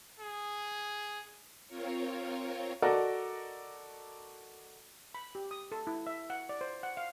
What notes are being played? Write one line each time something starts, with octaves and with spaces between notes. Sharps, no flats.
G#4
C4 F4 A#4 C#5
F#4 A4 A#4 D5 D#5
B5
G4
D#6
A4
E4
E5
F#5
D5
C5
F#5
F5